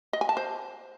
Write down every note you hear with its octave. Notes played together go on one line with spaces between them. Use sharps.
D#5
G#5
A5
C5